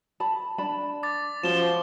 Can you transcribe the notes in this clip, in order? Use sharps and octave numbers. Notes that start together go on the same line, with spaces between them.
A5 B5
D4 A5 B5
D6 A6
F3 C#4 F#4 E7 G7